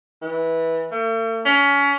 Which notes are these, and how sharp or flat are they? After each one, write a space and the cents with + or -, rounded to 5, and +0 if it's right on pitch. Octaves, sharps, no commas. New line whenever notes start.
E3 -15
A3 +45
C#4 +25